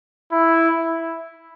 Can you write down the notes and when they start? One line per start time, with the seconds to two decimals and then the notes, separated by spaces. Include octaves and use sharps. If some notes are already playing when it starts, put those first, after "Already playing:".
0.32 E4